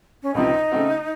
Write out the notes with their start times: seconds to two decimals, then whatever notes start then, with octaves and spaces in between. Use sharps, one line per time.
0.23 C#4
0.34 C#2 C3 F3 C4 D#4
0.71 C#3 A3 C4 F#4